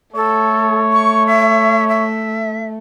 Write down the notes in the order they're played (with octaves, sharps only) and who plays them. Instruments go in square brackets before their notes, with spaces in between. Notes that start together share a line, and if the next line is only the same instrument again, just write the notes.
[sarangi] A3 [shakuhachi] A4 [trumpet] C#5
[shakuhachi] C#6
E5
E5